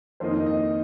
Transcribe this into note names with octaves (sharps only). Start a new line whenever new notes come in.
F2 D#3 A#3 D#4 C5
D#5
D#5